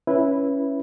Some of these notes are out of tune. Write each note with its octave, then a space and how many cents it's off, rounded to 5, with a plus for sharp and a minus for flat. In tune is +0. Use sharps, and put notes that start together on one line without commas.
C#4 +0 E4 +0 B4 -10